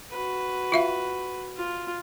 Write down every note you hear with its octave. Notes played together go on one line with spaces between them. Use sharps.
F#4 B4
F4 E5 F5
F4